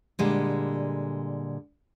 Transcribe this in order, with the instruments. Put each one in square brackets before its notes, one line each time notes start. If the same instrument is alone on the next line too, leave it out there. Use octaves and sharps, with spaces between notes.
[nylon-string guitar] A#2 D3 G3 G#3